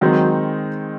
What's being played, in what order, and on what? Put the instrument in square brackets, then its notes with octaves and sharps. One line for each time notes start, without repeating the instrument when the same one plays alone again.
[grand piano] D#3 G#3 C4 D#4 [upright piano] F#3